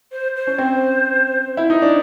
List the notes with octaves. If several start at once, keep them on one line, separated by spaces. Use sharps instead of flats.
C5
C5
C#4
C4
E4
D#4
D4